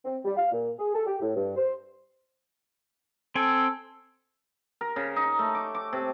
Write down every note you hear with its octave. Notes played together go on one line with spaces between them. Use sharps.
C4
G3
F5
A#2
G#4
A4
G4
A2
G2
C5
C4 A4 G5 G#5
A#4
C#3
D#4
A3
D6
D6
C3